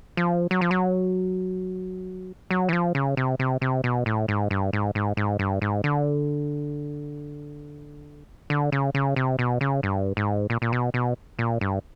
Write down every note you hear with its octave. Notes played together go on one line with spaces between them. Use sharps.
F3
F#3
F3
F#3
F#3
E3
F3
C#3
C3
C3
C3
B2
A2
G#2
G2
G#2
G#2
G#2
G2
G#2
D3
D3
C#3
C#3
C3
B2
C#3
G2
G#2
A#2
A#2
B2
B2
A#2
G2